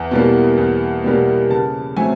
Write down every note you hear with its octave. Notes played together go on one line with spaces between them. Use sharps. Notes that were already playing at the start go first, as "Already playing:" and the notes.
Already playing: E2
B2 G3 A#3
E2
B2 G3 A#3
C#3 A5
F#3 A3 C4 G#5